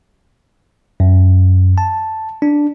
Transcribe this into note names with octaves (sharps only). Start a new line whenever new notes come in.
F#2
A5
D4